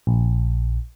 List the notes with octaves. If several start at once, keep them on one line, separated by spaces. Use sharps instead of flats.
A#1